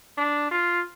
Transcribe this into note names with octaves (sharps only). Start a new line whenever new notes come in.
D4
F4